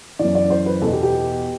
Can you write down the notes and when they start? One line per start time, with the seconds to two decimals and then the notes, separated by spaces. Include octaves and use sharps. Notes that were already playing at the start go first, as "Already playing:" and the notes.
0.19 F#2 E3 D5
0.35 D5
0.50 C5
0.66 B4
0.82 E2 B2 A4
0.93 G4
1.03 G4